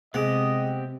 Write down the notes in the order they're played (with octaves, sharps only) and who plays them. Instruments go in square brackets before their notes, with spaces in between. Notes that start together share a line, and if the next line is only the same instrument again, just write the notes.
[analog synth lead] C3 [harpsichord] G#3 [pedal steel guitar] B3 C4 G4 [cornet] D#5